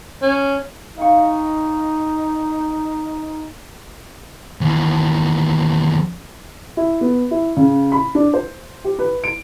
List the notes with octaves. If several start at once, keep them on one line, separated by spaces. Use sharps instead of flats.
C#4
D#4 F5 G5 C#6
D#2 E3
E4
B3
E4
C#3
B5
D4
C5
G4
B4
D7